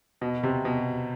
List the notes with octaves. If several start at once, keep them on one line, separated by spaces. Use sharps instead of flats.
B2
C3
B2